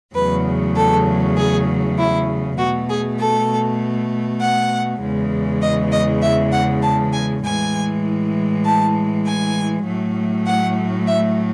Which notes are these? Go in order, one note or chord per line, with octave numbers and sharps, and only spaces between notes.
E2 C#3 F#3 A3 B4
A4
G#4
E4
B2 A3 F#4
G#4
A4
F#5
E2 C#3 E3 G#3
D#5
D#5
E5
F#5
A5
G#5
A2 E3 G#3 G#5
A5
G#5
A2 F#3 A3
F#5
E5